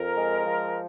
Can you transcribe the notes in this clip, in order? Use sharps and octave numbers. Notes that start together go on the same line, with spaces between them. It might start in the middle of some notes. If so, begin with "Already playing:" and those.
Already playing: F2 A#4
G#3
F3